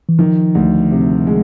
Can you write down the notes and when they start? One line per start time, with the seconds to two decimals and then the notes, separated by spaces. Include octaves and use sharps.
0.09 E3
0.19 D#3 F3
0.55 D2
0.91 C3
1.27 G#3